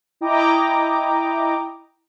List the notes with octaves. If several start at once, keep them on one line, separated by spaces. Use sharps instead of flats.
E4 D#5 G5 A#5 D6